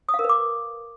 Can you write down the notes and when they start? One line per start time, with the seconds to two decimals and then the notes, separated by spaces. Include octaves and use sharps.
0.09 D#6
0.14 F5
0.19 A#4
0.24 B4
0.29 D6